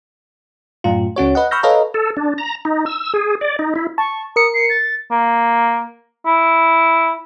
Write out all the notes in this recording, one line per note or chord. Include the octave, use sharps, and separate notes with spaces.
F#2 A2 F4
C#2 C#4 F#4 C#5
B4 D#5 F#5
B5 C#6 E6 F6 G6 A#6
A4 B4 C#5 D#5 F5 A#5
A4
D4
A#5
D#4
E6
G#4
D5
D#4
E4
A5 C#6
A#4 D#6 C#7
C7
A6
A#3
E4